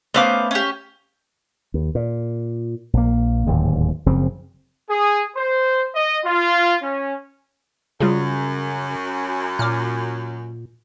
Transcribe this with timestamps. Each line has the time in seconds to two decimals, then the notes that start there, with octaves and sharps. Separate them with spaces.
0.14 A3 B3 C#4 C5 F5 D6
0.51 C#4 G4
1.74 D#2
1.95 A#2
2.93 A#1 A#3
3.47 D1 D#2 G#2
4.06 F#1 C#3 F3 C4
4.90 G#4
5.36 C5
5.95 D#5
6.25 F4
6.82 C#4
8.00 F#2 C#3 G3 F4 G#4
9.59 A#2 D6 F6